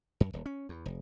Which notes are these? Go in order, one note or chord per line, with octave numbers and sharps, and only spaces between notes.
F#2
D#1
C#4
E2
F1